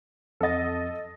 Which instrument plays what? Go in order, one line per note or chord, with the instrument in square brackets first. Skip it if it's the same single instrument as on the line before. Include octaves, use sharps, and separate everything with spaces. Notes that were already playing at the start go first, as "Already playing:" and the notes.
[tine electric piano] F2 A6 [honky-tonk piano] A4 D#5